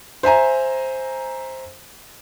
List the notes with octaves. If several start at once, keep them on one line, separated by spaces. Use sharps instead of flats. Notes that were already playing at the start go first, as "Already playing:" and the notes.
C5 E5 G#5 A#5